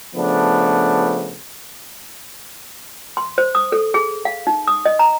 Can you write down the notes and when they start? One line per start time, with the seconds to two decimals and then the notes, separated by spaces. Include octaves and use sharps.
0.16 C#3 F3 A3 B3 D4
3.17 C6
3.38 C5
3.55 D#6
3.72 A4
3.94 G#4
4.25 F5
4.47 D#4
4.67 D#6
4.85 D#5
4.99 A#5